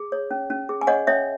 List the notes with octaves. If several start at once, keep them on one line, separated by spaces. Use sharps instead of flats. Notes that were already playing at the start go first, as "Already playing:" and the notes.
Already playing: G#4
C#5
C#4
C#4
G#4
G#5
C#5 D#5 F#5
C#4 C#5 E5